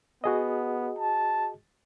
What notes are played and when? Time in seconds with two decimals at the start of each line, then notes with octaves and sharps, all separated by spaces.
0.24 B3 F#4 G#4 D#5
0.98 A5